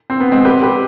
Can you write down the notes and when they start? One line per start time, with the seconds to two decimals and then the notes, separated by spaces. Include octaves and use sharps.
0.10 C4
0.20 B3
0.32 G#3 C4
0.45 G4 B4
0.63 G4 B4